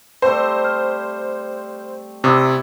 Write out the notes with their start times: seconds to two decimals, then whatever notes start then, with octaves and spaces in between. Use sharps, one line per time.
0.22 G3 A3 C4 C5
0.65 F6
2.24 C3 E4 D5 F#5 C#6 D#6 E6